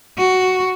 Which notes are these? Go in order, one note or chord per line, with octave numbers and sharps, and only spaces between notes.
F#4